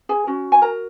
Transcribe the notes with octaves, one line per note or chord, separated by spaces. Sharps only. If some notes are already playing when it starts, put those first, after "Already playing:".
G#4 G#5
C#4 F#4
G#5
A#4 A#5